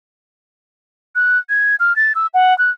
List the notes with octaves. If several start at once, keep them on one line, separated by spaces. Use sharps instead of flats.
F#6
G#6
F6
A6
E6
F#5
F#6